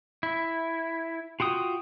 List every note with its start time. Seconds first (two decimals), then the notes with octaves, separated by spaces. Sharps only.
0.23 E4
1.40 F4 F#4 G5 D#6